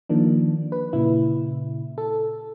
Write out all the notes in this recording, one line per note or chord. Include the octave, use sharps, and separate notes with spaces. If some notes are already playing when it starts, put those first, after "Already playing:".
D#3 F3 A#3 D4
B4
A#2 C#3 E4
A4